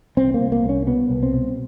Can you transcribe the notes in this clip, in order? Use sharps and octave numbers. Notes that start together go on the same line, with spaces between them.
C2 C4
A#3
C2
A#3
C2
C#4
B2 B3
C2
C4
B2